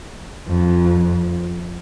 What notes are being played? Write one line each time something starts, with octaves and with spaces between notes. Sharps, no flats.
F2